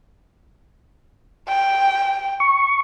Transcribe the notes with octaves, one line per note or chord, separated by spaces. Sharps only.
G5
C#6